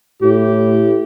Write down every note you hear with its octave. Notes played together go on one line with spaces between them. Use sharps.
A2 G4